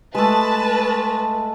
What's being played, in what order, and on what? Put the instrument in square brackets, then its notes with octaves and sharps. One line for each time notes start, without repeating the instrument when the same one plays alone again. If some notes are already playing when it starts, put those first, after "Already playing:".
[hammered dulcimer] G#3 A3 [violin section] B4 A5